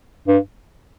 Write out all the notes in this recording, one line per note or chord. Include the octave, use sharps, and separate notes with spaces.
G2